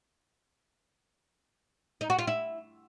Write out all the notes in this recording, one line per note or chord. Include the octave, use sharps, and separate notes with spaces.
D#4
F#4
F4
E4